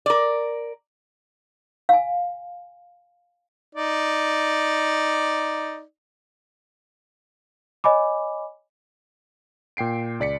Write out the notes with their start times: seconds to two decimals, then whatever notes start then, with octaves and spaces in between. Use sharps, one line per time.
0.06 A#4 D5
1.89 F5 G#5
3.75 D#4 D5
7.84 C#5 D#5 G#5 B5 D6
9.77 A#2 G5 C7 D7
10.20 C#2 D5 B6 C#7